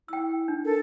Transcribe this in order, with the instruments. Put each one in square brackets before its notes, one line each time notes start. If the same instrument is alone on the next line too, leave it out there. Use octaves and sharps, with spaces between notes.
[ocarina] E4 [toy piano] G5 E6
[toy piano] D4
[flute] A4 [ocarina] A#4